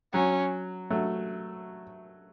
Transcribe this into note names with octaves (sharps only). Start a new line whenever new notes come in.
F#3 C#4
F#3 A3